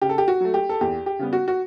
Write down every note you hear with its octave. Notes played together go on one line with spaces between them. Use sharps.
C#3 G4
A4
G4
F#4
F#3 A3
G4
A4
E2 G4
G4
C#3 G3 B3
F#4
F#4